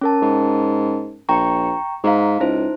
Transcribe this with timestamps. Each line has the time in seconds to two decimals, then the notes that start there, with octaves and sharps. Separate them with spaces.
0.01 C#4 A#4 A5
0.22 G#2
1.29 A#1 G5 A#5 C#6
2.04 G#2 F5 A#5
2.40 C#2 D#4 E4 C5